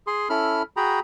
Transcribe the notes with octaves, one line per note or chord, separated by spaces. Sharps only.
G#4 C6
C#4 E4 A4 B5 F6
F#4 G#4 G5 A#5 B5